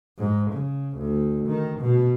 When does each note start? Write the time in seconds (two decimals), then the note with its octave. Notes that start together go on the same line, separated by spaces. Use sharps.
0.18 G#2
0.52 C#3
0.98 D2
1.48 D#3
1.81 B2